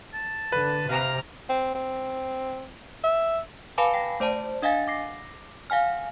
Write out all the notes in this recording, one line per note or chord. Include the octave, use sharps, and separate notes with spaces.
A5
D3 B4
C3 F5 A#5 F6
C4
C4
E5
B4 F5 G#5 A5 B5 D6
G5 A#6
A3 C5 D5 A5
D4 D#5 F5 F#5 G#5 A6
D6 A#6 C7
F5 F#5 G#5 F6